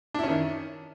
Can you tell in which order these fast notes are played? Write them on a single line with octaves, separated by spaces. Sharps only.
D4 E4 C#4 D#3